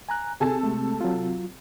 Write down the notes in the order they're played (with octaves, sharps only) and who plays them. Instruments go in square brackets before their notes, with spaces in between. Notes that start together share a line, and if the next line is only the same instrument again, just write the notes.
[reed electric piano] G#5 A#5 F#6
[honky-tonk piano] C3 A4 A5 [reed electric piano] G#4 G#5
[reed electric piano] G#3 A3
F#3 F4